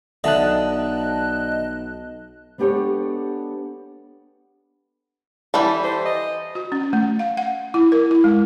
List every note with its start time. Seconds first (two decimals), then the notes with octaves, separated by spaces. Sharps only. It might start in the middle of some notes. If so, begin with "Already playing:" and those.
0.24 B1 D3 D#5 E5 A5 F#6
2.58 G#3 B3 D4 G4 A4 C#5
5.54 E3 G3 A4
5.84 C5
6.05 D#5
6.55 F#4
6.72 C#4
6.93 A3
7.19 F5
7.37 F#5
7.74 E4
7.92 A#4
8.11 E4
8.24 G#3